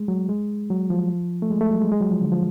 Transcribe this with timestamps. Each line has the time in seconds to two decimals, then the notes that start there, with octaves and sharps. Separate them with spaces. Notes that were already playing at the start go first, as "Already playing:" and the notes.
Already playing: G#3 A3
0.08 F#3
0.29 G#3
0.70 F#3
0.90 F3
1.42 A3
1.50 G#3
1.61 A3
1.71 F#3
1.82 G#3
1.92 G#3
2.01 F#3
2.11 F3
2.22 D3
2.32 F3